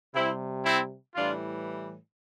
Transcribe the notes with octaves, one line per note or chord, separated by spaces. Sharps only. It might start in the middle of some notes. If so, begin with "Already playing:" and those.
C3 G3 C4 E4
C4 E4
A2 E3 G3 D4 F4